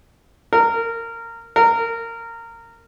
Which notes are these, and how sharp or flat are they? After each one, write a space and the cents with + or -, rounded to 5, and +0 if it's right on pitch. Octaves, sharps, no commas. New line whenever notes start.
A#4 -20
A#4 -20